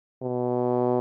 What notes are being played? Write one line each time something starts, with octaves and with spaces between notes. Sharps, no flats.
B2